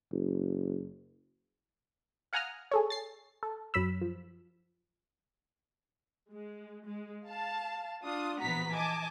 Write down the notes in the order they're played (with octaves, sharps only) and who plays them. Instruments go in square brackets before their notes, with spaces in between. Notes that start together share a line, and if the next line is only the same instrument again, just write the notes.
[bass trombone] F#1
[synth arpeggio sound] F5 F#5 G#5 A#5 D#6 F6
G#4 A4 C#5
A6 C7
A4
F#2 F#3 B5 E6
F3
[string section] G#3
G#3
F5 A5
D4 F4 D#6
A#1 E3 B3 F#4 A#5 B6
D#5 G#5 A5 D6